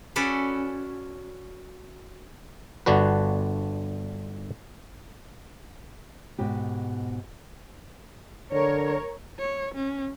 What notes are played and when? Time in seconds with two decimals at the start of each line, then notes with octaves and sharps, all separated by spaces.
0.16 C#4 F#4 A4 B4 D5
2.86 G1 D3 D4 F#4 B4
6.38 G#2 B2 G4
8.52 D3 A#4 C#5
9.39 C#5
9.75 C#4